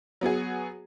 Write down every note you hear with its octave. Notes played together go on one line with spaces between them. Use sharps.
F#3 B3 F#4 G#4